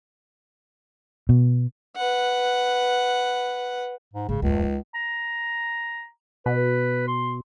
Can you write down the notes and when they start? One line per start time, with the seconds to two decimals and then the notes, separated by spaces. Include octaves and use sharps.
1.29 B2
1.96 B4 F#5
4.14 G#2
4.29 G#1 C#3
4.42 D1 C#2 F#2
4.62 D#4
4.95 A#5
6.46 B2 B4
7.08 C6